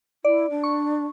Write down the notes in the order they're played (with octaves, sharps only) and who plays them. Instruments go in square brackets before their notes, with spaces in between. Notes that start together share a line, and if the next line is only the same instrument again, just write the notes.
[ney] E4 [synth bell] D5
[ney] D4
[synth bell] C#6